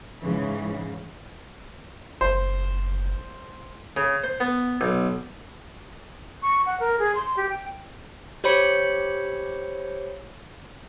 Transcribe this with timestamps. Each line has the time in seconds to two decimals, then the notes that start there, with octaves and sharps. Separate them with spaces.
0.23 G#2 C#3 E3
2.21 F#1 C5
3.97 C#3
4.24 C5
4.40 B3
4.81 B1
6.42 C#6
6.66 F#5
6.80 A#4
6.99 G#4
7.15 C6
7.37 G4
7.49 G5
8.44 G4 C5 C#5 B5 C#7